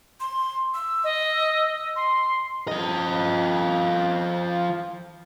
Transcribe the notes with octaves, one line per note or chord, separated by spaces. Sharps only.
C6
E6
D#5
C6
F3 D#5